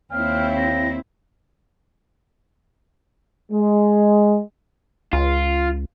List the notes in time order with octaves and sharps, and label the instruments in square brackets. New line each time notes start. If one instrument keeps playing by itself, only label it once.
[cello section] D#2 C4 E4 [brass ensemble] C#5 F5 G5 [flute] F6
[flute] A#6
[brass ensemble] G#3
[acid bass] C#2 [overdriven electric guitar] F4